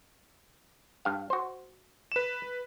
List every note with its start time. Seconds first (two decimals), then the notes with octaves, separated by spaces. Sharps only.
1.05 G2 F5
1.30 F#4 C5
2.12 B4 E7